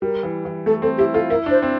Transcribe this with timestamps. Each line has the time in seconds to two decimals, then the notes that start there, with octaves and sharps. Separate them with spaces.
0.02 G3 A#4
0.23 E3
0.45 E3
0.66 A3 A4
0.82 C4 A4
0.98 E4 G4
1.14 F4 A4
1.30 E4 A#4
1.46 D4 C5
1.62 C4